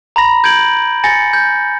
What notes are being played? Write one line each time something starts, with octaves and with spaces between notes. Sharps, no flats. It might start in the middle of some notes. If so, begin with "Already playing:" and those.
A#5 B5 A#6
G6 G#6 D7 F#7
G#5 A6 A#6 C#7
G6